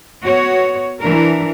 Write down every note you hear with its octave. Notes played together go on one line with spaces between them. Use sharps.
B3 F#4 C#5
E3 D4 A#4